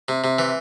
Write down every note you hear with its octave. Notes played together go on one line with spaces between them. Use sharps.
C3
C3
E3